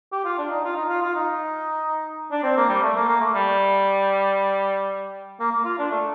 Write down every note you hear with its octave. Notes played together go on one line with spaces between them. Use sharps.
G4
F4
D4
D#4
F4
D#4
F4
F4
D#4
D4
C4
A#3
G3
A3
A#3
A#3
A3
G3
A#3
A#3
F4
D4
A3